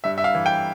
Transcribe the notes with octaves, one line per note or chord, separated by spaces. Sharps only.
G2 E5
E5
F5
E3
G5